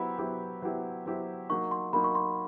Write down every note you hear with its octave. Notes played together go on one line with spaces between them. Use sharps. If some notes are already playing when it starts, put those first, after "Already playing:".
Already playing: F#3 B3 E4 G4 C5 B5
F#3 B3 E4 G4 C5
F#3 B3 E4 G4 C5
F#3 B3 E4 G4 C5
F#3 A#3 D#4 C#6
C6
F#3 A#3 D#4 B5
C#6
C6